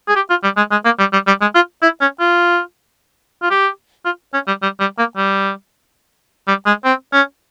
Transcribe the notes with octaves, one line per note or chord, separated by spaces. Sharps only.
G#4
G4
F4
G3
G#3
G#3
A#3
G3
G3
G3
G#3
F4
E4
C#4
F4
F4
G4
F4
C#4
G3
G3
G3
A#3
G3
G3
G#3
C4
C#4